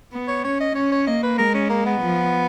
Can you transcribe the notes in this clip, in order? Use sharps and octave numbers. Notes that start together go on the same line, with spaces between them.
B3
C#5
C#4 C#5
D#5
C#4 C#5
C#5
A#3 D#5
B4
G#3 A#4
C#4
A#3
B3
F3